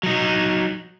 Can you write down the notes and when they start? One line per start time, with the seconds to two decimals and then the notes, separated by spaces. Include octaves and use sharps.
0.03 F#3 D#4